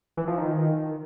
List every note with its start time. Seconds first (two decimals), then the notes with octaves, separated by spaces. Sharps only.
0.17 E3
0.28 F3
0.38 D#3